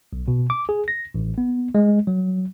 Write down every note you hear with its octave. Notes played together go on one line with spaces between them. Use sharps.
B1
B2
D6
G#4
A#6
A1
B3
G#3
F#3